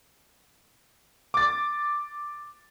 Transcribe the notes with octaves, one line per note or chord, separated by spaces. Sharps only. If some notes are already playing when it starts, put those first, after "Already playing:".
D6 A6